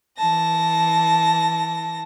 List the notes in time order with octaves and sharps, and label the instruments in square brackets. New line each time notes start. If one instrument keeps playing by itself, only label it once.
[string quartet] E3 A5 A#6